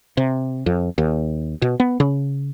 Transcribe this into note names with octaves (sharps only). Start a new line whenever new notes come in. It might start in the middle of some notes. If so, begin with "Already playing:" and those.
C3
F2
D#2
B2
B3
C#3